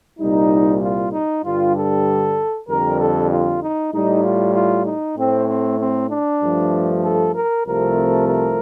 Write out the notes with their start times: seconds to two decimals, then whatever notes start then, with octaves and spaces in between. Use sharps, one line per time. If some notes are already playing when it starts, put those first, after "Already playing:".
0.19 C2 A#2 G3 D#4
0.81 F4
1.12 D#4
1.43 G2 D3 G3 F4
1.75 A4
2.68 F2 D3 G3 A#4
2.99 A4
3.30 F4
3.61 D#4
3.93 A2 G3 D#4
4.24 F4
4.54 F4
4.86 D#4
5.16 A2 A3 C4
5.48 C4
5.79 C4
6.10 D4
6.42 G2 F3 A3
7.04 A4
7.35 A#4
7.65 C2 C3 F3 A3 A#4
8.28 A#4